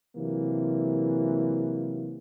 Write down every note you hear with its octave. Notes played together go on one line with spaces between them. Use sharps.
C3 E3 F#3 A#3